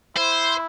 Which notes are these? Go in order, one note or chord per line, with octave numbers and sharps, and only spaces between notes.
E4 C5